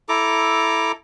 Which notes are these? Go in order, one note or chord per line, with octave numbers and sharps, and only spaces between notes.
E4 A4 A#5 D6